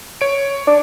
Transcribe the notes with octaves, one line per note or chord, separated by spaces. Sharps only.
C#5 D7
D4